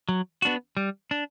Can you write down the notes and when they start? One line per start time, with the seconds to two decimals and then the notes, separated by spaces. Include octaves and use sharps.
0.09 F#3
0.42 B3 D4 F#4
0.77 G3
1.11 D4